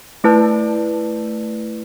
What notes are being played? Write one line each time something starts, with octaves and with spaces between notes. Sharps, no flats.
A3 E4 B4 D5 A5